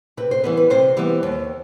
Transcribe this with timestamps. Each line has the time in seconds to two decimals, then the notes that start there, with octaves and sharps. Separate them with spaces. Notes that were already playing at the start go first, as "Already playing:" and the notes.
0.17 C3 B4
0.31 C5
0.44 E3 G3 B3 B4
0.57 B4
0.70 C3 C5
0.97 E3 G3 B3
1.23 D#2